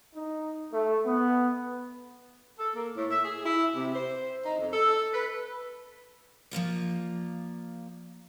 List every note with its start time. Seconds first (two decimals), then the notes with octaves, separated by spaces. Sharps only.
0.14 D#4
0.73 A3
1.05 B3
2.59 A4
2.76 A#3
2.96 A2
3.10 E5
3.25 G#4
3.46 E4
3.75 C3
3.95 C5
4.45 D#4
4.59 F2
4.73 A4
5.14 B4
6.51 F3 A#3 F4 D5